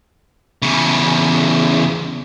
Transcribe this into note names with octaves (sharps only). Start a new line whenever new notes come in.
E2 C#3